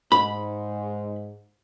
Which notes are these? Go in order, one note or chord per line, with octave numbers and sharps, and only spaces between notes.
G#2 B5